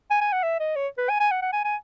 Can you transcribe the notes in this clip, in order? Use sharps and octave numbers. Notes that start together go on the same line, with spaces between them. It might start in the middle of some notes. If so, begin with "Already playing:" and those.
G#5
G#5
F#5
E5
D#5
C#5
B4
G#5
G#5
F#5
F#5
G#5
G#5